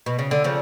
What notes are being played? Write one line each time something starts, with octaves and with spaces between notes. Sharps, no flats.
B2
C#3
D3
C#3 F3